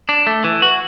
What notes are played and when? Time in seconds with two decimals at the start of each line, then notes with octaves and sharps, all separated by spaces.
0.09 D4
0.27 A3
0.44 E3
0.62 F#4